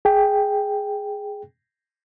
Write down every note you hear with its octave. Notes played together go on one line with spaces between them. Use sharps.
G#4 G5